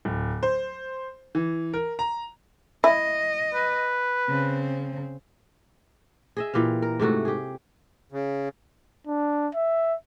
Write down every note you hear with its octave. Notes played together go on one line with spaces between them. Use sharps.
D1
C5
E3
A#4
A#5
E4 D#5
B4
C#3 C4
G#4 D#5 E5
A#2 E3 G4 F5
A#4
G#2 C3 A3 F#4
G4 G#4
C#3
D4
E5